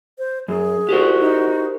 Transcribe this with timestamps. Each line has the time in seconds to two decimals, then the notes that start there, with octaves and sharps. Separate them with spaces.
0.18 C5
0.48 F#2 G#4
0.89 F#4 G4 A#4 C5
1.20 D#4